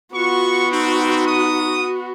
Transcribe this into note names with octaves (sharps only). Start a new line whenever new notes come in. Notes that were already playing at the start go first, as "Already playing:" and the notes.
B3 F4 F#4 C#6
C4 D#4
D#6